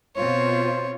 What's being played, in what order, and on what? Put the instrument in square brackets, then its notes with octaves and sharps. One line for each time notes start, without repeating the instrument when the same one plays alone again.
[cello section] B2 C4 F4 [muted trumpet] C5 [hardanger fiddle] C#5